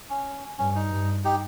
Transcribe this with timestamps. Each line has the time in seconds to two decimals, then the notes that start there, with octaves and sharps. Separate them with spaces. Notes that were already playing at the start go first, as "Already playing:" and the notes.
0.10 C#4
0.58 G2 C#4
0.76 D#4
0.91 G2
1.24 D#4 G4